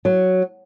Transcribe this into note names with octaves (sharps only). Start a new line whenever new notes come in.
F#3